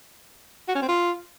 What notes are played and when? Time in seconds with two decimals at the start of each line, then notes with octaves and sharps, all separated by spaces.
0.68 F#4
0.75 C#4
0.82 C4
0.89 F4